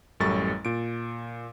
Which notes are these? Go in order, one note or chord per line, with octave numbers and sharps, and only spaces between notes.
A1 F#2 G3 A4 C#6 A6
A#2 D7